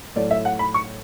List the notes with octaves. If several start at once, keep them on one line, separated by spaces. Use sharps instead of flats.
A2 F#3 A3 D5
E5
F#5
B5
C#6